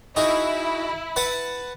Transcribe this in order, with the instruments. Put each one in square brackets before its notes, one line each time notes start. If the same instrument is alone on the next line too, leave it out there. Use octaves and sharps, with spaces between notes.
[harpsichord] D#4 F#4 G#4 [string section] E4
[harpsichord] B4 F#5 A5